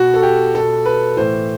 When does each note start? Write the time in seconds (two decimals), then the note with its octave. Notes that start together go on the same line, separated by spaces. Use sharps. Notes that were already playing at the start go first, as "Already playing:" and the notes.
Already playing: B2 F#4
0.14 A4
0.23 G4
0.55 B2 A4
0.86 B4
1.16 A2 E3 C5